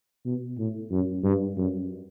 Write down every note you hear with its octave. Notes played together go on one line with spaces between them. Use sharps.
B2
A2
F#2
G2
F#2